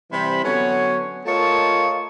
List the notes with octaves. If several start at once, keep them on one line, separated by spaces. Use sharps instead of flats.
C3 E3 G3 C5 B5
D3 F#3 B3 C#4 C#5
A3 F4 A#4 C#5 D#5 A5